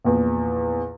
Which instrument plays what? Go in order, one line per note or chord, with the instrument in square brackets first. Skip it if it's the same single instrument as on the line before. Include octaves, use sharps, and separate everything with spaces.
[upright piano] A#1 E2